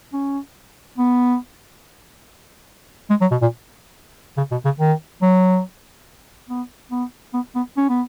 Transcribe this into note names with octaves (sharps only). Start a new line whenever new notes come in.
C#4
B3
G#3
F#3
B2
A#2
C#3
B2
C#3
D#3
F#3
B3
B3
B3
B3
C#4
B3